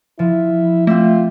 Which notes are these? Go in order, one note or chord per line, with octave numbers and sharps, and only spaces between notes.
F3 E4
A3 C4 F4 E5